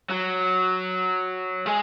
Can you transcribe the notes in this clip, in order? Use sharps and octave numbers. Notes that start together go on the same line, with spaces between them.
F#3
G#3